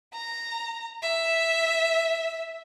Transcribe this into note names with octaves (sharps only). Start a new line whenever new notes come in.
A#5
E5